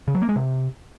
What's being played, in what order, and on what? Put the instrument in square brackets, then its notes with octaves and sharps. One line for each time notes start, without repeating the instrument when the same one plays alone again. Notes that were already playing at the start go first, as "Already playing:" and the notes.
[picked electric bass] C#3
F#3
A#3
G#3
C3